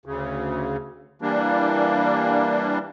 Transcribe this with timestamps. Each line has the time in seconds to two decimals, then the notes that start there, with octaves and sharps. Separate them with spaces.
0.06 D2 C#3
1.22 E3 G3 A#3 D4